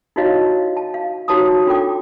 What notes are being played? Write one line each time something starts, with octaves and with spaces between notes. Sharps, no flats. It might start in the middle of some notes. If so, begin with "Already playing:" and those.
D#4 E4 F#4 C#5 D#5 F5
A5
F5
D#4 F#4 C#5 A5 A#5 D#6
D4 F4 A4 G5 D6